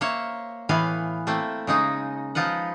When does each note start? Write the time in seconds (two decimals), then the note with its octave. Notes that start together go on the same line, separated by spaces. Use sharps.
0.01 A#3 C5 C#5 E5
0.69 A2 E3 B3 F5 G#5
1.27 A3 A#3 C4 E4
1.67 C#3 G#3 D#4
2.35 F3 D#4 F4 B4 F#5